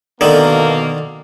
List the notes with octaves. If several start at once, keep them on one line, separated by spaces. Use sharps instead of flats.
B2 D3 D#3 A#3